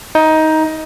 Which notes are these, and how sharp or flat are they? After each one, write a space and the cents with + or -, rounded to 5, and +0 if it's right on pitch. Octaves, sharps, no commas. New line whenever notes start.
D#4 +15